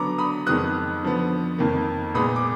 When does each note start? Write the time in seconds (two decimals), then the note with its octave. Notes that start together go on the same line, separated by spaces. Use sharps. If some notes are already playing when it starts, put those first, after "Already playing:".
Already playing: D3 F#3 B3 A#5 D6
0.18 B5 D#6
0.46 F2 D#3 G#3 B3 D#6 F#6
1.03 D3 F3 B3
1.58 F2 D#3 A#3
2.14 A#2 G#3 B3 B5 D#6
2.36 D6